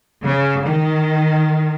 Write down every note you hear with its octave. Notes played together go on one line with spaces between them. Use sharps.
C#3
D#3